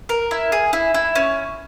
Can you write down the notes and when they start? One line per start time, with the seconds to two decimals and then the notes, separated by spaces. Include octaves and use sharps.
0.09 A#4
0.31 E4
0.52 G#4
0.73 E4
0.94 E4
1.15 C#4